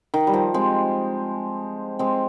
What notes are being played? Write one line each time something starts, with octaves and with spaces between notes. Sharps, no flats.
D#3
G3
F3
G#3 C4
G#3 C4